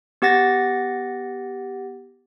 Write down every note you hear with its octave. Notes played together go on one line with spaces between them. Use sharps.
B3 G4 F#5 A6 A#6